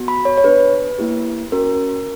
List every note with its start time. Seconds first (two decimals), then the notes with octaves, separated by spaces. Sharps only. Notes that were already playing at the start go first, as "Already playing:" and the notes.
Already playing: B3 F#4
0.08 B5
0.25 C#5
0.38 C#5
0.44 B3 D4 G4 B4
0.99 A#3 E4 G4
1.52 C#4 F#4 A#4